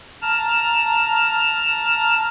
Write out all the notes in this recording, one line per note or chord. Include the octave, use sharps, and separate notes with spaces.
A5 A#5 F6